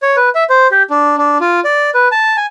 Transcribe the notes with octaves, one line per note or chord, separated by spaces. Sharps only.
C#5
B4
E5
C5
G4
D4
D4
F4
D5
B4
A5
G#5